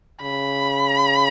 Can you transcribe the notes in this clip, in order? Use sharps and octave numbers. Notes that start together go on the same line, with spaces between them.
C#3 B5